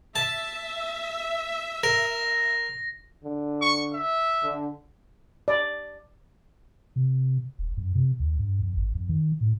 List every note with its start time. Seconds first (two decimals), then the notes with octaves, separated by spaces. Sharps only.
0.16 E5 A5
1.83 A#4 A#6
3.24 D3
3.62 C#6
3.94 E5
4.42 D3
5.48 D5
6.96 C3
7.59 D#1
7.77 F#2
7.95 C3
8.20 D#2
8.39 G2
8.61 F2
8.76 G#1
8.95 F2
9.09 D#3
9.41 A2